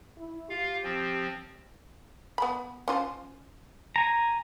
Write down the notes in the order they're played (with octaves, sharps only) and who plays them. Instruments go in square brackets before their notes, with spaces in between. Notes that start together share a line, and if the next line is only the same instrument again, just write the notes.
[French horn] E4
[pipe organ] F4 F5 [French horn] G4
[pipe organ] F3 C4
[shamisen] B3 B5
C#4 F4 C5
[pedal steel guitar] G#5 A#5